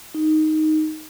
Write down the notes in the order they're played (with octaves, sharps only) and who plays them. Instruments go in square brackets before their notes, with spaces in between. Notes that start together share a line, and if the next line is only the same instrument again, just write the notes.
[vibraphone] D#4